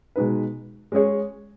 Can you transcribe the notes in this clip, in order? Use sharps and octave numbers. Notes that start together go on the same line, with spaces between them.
B2 G#3 D#4 B4
G#3 C#4 G#4 C#5